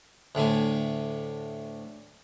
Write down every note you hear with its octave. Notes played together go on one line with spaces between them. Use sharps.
D2 A2 D3 G#5